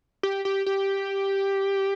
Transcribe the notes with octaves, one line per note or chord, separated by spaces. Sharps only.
G4
G4
G4